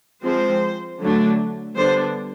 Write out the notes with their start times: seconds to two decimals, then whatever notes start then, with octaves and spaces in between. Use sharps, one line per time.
0.24 F3 G#3 C4 C5
1.00 D3 F#3 A3 D4
1.76 D3 G3 B3 D4 C5